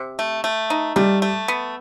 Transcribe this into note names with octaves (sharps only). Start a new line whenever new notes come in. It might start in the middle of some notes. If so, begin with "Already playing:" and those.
Already playing: C3
A3
A3
D#4
G3 A3
A3
B3